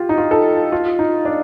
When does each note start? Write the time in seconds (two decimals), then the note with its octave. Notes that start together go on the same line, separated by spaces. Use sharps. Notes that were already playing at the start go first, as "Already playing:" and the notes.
Already playing: F4 G4
0.09 D#4
0.18 F4
0.31 A4
0.72 F4
0.99 D#4
1.25 D4